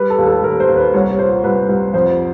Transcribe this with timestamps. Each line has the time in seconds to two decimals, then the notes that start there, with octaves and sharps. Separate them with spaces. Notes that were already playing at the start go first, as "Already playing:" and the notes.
Already playing: G3 B4
0.10 A4
0.18 D#2
0.27 A4
0.44 D#2 A#4
0.60 C5
0.69 D#2
0.77 B4
0.94 C2 C#5
1.19 A#2 C5
1.44 C2 B4
1.69 C2
1.94 F2 C5